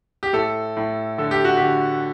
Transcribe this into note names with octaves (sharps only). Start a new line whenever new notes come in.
G4
A2 A4
A2
D3 A4
G4
F#4
D3 G4